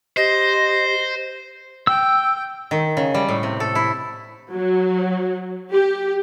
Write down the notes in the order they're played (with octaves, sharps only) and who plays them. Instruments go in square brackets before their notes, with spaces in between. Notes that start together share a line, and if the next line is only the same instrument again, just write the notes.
[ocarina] G4 [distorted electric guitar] C5 [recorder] D#5
[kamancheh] G5 [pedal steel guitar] E6
[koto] D#3
C#3
G3
A2
C3
A4
E4
[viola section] F#3
G4